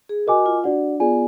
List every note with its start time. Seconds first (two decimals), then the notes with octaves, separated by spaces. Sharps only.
0.09 G#4
0.27 F#4 A#4 D#5 G#5 D6
0.46 F4
0.64 D4 F#4 D5 F#5
1.00 B3 F4 G#4 D5 G#5